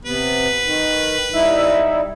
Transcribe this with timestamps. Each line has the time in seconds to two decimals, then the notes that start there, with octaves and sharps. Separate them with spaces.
0.05 C3 B3 B4
0.63 D#3
1.33 G3 D#4 E4 E5